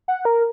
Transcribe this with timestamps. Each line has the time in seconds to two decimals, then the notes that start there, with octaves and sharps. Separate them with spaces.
0.08 F#5
0.25 A#4